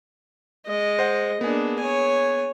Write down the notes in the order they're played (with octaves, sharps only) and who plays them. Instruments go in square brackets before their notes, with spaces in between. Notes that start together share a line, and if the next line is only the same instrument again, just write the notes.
[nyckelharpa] G#3 D#5
[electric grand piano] C5 F#5
[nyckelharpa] A#3 D4 [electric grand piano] B3 G#4
[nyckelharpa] C#5 G#5